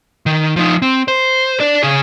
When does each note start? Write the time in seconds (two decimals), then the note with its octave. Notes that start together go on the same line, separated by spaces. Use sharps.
0.26 D#3
0.56 F3 D#4
0.82 C4
1.08 C5
1.60 D4 D5
1.83 C#3 G#4